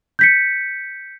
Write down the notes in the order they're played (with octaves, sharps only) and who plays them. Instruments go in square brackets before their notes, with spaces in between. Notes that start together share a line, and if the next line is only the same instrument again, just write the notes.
[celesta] G6 B6 C#7